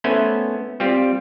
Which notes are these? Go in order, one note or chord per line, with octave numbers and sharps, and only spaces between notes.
A3 B3 C#4 E4 C5 G#5
G3 C4 F4 G4